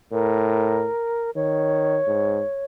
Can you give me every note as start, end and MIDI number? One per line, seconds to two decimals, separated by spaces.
0.12 0.88 45
0.12 1.30 70
1.36 1.99 51
1.36 2.65 73
2.07 2.42 44